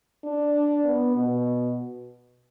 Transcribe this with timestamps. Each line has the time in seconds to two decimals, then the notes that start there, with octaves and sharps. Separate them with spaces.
0.24 D4
0.85 B3
1.15 B2